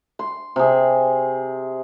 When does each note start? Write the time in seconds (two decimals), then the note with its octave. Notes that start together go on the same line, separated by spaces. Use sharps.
0.19 C6
0.56 C3 G#4